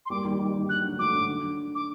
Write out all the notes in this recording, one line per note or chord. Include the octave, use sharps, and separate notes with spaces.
C6
G3 A#3 D6
D#3 G3
D#3 G3
D#3 G3
D3 F#3 F#6
D3 F#3
F#3 A3 D6
D3 F#3
D3
D6